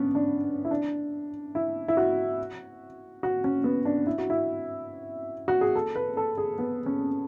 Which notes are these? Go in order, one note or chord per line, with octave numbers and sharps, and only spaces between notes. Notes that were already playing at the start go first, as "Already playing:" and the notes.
Already playing: B3 C#4 D4
D4
E4
D4
E4
E4
F#4
F#4
C#4
B3
D4
E4
F#4
E4
F#4
G#4
A4
B4
A4
G#4
B3
C#4